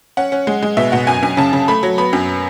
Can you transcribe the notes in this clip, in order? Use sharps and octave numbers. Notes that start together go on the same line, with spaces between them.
C#4 F#5
C#4
G#3
G#3
B2 E5
B2 F#5
F#2 G#5
F#2 G#5
C#3 A5
C#3
A3 B5
F#3
B3 B5
F#2